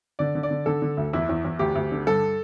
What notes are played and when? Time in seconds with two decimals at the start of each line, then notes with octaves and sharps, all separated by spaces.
0.19 D3 D5
0.35 D3
0.43 D5
0.51 D3
0.66 D3 A4
0.82 D3
0.97 D2
1.13 E2 E4
1.29 E2
1.45 E2
1.59 D2 G4
1.75 D2
1.92 D3
2.07 G2 A4